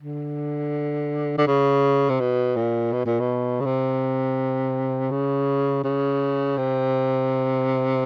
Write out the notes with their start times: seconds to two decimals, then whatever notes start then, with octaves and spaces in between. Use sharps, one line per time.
0.02 D3
1.38 D3
1.47 C#3
2.09 C3
2.20 B2
2.56 A#2
2.93 B2
3.06 A#2
3.20 B2
3.60 C#3
3.65 C3
5.11 C#3
5.84 C#3
6.58 C3